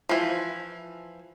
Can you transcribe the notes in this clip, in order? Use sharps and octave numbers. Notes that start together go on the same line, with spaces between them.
E3 F3